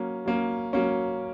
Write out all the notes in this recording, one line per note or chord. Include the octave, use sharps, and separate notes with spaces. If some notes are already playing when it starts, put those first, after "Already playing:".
Already playing: F#3 A#3 C#4
F#3 A#3 C#4
F#3 A#3 C#4